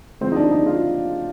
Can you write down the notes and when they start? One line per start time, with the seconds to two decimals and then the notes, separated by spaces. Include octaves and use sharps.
0.21 G#2 F3 G#3 C4
0.32 D#4
0.36 D4
0.51 D#4
0.66 F4